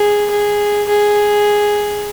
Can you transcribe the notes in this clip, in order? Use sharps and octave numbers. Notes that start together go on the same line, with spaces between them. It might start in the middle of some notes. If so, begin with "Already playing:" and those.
Already playing: G#4
G#4
G#4